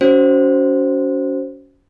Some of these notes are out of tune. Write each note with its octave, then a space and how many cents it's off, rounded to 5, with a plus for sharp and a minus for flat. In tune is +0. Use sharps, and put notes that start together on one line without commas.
C#4 +25 F#4 +15 C5 +0